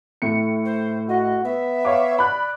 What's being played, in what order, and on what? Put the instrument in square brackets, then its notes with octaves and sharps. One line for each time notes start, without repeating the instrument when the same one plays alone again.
[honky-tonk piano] A2 C#7
[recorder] C5
[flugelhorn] F#4 [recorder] D#5
[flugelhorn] B3 [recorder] E5
[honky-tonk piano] C#5 F5 D6
[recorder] D5 [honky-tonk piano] B5 F#6